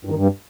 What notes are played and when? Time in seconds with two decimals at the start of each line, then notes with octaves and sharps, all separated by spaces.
0.05 G2
0.10 D#3
0.15 G2